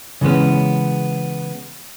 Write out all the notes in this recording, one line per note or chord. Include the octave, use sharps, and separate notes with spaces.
C#3 E3 G#3 B3 C#4